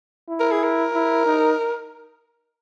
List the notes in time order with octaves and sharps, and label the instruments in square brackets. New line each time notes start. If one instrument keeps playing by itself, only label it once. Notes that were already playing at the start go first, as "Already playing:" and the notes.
[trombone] E4
[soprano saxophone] A#4
G#4
A#4
[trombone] E4
D#4